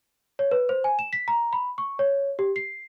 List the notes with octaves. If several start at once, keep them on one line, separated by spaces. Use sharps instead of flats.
C#5
B4
C5
G#5
E7
B6
A#5
B5
C#6
C#5
G4
C7